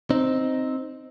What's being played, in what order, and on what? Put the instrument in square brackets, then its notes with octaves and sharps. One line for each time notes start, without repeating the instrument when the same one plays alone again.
[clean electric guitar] C4 D#4